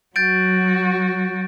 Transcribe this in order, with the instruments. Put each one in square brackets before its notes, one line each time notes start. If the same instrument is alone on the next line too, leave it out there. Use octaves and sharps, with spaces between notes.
[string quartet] F#3 F#4 [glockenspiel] G6 A6 D7